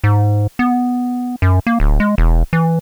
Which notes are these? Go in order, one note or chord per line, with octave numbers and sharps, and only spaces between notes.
G#2
B3
F#2
A#3
D1
G#3
E1
E3